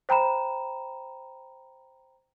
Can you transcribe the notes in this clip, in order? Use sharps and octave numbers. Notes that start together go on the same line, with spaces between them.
C5 G5 A#5 B5 E7